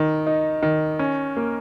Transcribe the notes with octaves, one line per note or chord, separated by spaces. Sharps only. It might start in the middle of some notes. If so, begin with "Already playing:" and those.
Already playing: D#3
D#4
D#3
C#4
A#3